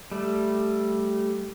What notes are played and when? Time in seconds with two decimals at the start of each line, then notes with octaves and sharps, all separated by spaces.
0.12 G3 A3